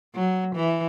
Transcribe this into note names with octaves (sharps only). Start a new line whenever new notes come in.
F#3
E3